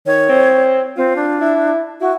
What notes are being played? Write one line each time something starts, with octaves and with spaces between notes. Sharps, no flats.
D#3 C#5
C4
C4 F4
D4
E4
E4 F#4